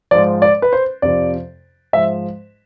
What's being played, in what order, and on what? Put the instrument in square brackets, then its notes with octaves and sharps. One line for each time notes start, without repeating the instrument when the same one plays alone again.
[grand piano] G#2 F3 D5
D5
B4
C5
F2 C3 F3 D5
G#2 F3 E5